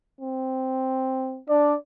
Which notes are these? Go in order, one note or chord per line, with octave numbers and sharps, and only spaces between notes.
C4
D4 D5